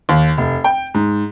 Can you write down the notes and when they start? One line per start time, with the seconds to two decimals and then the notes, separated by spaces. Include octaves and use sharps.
0.09 D#2
0.38 F1
0.64 G5
0.94 G#2